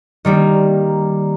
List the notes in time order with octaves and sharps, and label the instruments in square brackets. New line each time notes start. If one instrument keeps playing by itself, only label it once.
[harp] D#3 G3 A#3